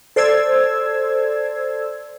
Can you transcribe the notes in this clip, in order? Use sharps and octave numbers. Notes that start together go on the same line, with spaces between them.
A4 C5 D5 E6 G#6